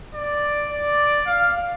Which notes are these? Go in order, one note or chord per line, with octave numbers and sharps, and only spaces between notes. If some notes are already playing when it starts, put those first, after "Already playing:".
D5
D5
F5